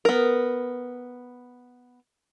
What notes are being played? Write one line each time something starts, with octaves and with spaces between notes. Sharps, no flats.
B3 A#4